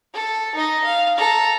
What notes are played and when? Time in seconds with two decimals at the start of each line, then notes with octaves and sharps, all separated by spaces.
0.14 A4
0.54 D#4 D#5
0.84 F5
1.17 A4 A#5